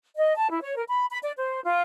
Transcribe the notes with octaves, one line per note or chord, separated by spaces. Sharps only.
D#5
A5
E4
C#5
A#4
B5
B5
D5
C5
F4